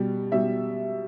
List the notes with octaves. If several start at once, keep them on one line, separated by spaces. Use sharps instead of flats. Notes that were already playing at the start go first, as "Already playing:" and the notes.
Already playing: B2 G3
B2 G3 E5